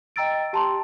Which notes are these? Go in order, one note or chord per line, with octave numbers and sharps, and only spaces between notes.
D#5 G5 A#5 E6 A6 D7
G4 A5 A#5 C6